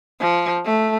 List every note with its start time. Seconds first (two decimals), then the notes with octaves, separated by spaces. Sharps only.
0.20 F3
0.65 A3